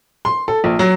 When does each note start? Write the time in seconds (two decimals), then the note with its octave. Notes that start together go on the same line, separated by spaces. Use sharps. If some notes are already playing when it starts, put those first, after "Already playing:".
0.25 C6
0.48 A4
0.64 A#1
0.79 F#3